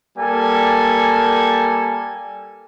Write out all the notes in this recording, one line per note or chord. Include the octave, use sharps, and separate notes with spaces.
G3 A#3 A4 G#5